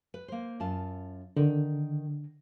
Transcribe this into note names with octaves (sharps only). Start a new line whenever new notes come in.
B4
A#3 C5
F#2 F4 A5
D3 D#3